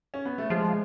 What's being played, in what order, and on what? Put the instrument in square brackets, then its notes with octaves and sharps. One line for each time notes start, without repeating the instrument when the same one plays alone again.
[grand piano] C#4
B3
A3
[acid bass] F3 [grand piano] G#3